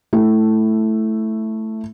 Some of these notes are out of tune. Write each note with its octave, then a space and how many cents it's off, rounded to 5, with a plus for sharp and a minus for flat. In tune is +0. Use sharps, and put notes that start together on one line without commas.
A3 +0 E4 +0